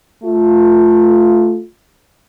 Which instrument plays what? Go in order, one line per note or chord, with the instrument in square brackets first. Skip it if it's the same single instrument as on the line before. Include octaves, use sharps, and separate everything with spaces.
[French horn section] A3 F4